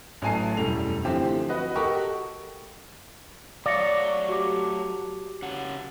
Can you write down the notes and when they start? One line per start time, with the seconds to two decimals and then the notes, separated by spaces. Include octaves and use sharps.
0.22 A1 F#3 A3 G#5 A5 C7
0.57 E1 F#2 A2 G3 A4 F7
1.05 D3 E3 F3 A3 C4 G4
1.49 F#4 B4 D#5
1.75 F#4 G4 A4 A#4 D#5 C#6
3.66 F#3 A3 C#5 D5 F5 A#6 C#7
4.29 F#4 G4 D6
5.42 C#3 F#5